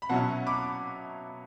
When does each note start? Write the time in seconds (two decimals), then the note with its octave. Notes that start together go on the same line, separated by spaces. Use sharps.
0.02 B5
0.09 B2 F#3 C#4 E4 F#5 A5
0.46 B5 D6